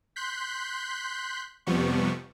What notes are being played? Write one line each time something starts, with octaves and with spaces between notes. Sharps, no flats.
C6 F#6 G6 B6
F2 C3 F3 G3 B3 C#6